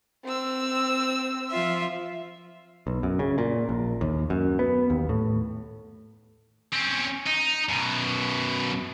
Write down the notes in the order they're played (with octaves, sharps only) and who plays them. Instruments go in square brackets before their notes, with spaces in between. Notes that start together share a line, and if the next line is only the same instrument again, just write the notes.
[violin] C4 E6
[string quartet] F3 F4 E5
[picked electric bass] B1
F#2
C#3
A#2
A#1
D#2
F#2
B3
D#2
A2
[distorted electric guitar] C4 C#4
D#4
F#2 B2